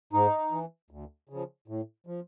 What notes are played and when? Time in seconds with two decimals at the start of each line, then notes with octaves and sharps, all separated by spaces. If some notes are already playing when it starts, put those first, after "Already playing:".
0.13 G#2 D#4
0.52 E3
0.91 D2
1.29 C#3 F3
1.68 A2
2.07 F3